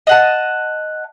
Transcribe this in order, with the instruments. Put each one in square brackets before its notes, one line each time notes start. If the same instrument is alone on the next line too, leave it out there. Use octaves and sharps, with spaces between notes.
[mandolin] D#5 F#5 A5